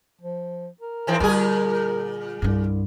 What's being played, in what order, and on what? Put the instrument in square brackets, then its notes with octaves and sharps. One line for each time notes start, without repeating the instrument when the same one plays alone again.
[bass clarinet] F3
A#4
[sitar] G#2 E3 C4
[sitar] A#2 G#4 [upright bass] D3 G3
[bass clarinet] C2 [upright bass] G2 D4